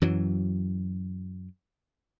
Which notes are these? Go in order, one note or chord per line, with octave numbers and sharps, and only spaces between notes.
F#2 E3 F#3